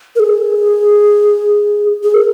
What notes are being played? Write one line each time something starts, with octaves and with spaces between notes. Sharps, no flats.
A#4
G#4
G#4
A#4